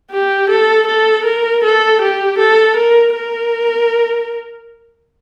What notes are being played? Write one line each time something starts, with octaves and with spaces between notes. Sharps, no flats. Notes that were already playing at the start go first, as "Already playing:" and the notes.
G4
A4
A4
A#4
A4
G4
A4
A#4
A#4